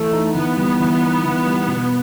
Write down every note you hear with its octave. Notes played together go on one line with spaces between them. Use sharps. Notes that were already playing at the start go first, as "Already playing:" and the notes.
Already playing: E3 A3
D#4
E3 B3
G3
E3
D#4
E3
G3
B2